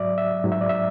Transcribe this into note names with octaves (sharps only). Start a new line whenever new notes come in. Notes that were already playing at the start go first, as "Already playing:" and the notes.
Already playing: G#2 F#3 D5 E5
E5
G#2 F#3
E5
D5
E5